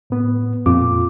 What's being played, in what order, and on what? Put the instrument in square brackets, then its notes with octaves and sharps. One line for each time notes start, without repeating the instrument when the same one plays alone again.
[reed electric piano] A2 B3
[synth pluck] F2 [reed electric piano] A#2 F4 D6